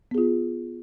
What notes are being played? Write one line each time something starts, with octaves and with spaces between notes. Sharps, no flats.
B3 F4 G#4